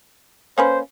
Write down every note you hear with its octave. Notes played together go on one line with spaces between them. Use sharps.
A#3 C#4 B4 C5